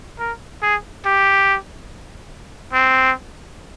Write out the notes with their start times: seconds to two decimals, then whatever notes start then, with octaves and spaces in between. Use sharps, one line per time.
0.19 A#4
0.62 G#4
1.05 G4
2.73 C4